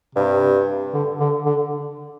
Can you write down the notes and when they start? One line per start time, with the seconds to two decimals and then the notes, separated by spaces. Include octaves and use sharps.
0.15 G2 C3
0.94 D3
1.20 D3
1.46 D3